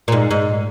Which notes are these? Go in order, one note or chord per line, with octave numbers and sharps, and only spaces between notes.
A#2
G#2
G#2